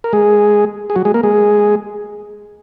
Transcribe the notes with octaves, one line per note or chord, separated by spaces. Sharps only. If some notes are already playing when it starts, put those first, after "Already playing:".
A#4
G#3 G#4
G#4
F#3 F#4
G#3 G#4
A#3 A#4
G#3 G#4